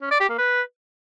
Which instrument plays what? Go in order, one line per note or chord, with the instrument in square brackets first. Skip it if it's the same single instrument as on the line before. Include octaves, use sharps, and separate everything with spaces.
[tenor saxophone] C#4
D5
G4
A#3
B4